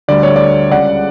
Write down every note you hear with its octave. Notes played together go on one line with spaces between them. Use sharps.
D2 D3 G3 D5
C#5
D5
C#2 C#3 G3 D5 F#5